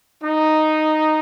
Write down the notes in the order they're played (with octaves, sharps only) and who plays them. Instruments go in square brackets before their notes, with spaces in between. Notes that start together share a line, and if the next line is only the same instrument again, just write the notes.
[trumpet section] D#4